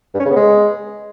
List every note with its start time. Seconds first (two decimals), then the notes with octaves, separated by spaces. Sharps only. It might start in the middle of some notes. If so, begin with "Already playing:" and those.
0.14 G2
0.20 C#4
0.25 C#3
0.31 B3
0.36 G#3